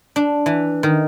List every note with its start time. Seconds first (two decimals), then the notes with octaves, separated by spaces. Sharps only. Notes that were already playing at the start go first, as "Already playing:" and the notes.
0.16 D4
0.46 E3
0.83 D#3